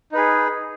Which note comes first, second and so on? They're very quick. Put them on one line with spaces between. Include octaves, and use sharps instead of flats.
D#4 B4 G#4